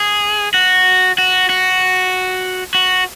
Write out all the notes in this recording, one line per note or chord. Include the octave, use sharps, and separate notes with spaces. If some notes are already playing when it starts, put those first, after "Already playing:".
Already playing: G#4
F#4
F#4
F#4
F#4